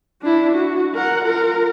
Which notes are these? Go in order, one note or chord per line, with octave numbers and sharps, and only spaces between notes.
D4 E4
F#4
A#4 F#5
F4 A#4